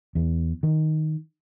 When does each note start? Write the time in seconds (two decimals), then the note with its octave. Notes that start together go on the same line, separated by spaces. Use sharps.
0.15 E2
0.63 D#3